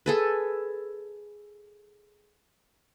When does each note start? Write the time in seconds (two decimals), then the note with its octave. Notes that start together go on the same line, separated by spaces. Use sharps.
0.06 G#4 A4 B4